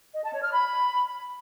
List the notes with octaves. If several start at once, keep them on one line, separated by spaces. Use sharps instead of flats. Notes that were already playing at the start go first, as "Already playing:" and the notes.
D#5
A5
C#5
F6
B5